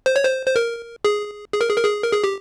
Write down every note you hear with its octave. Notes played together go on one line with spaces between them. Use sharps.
C5
C#5
C5
C5
A#4
G#4
G#4
A#4
G#4
A#4
G#4
A#4
G#4
G4